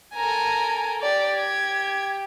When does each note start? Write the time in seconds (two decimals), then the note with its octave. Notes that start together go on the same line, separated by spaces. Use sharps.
0.15 A4 A#4 G#5 A#5
1.01 G4 D5
1.36 G#6